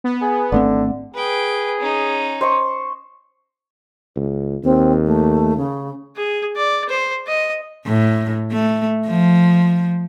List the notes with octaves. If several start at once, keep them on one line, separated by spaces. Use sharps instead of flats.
B3
G#4
G#1 D3 A3 C4
G#4 B4 G5
C#4 D#4
C5 D#5 C#6
C#2
D#2 C4
A3
C#3
G#4
D5
C5
D#5
A2
A3
F3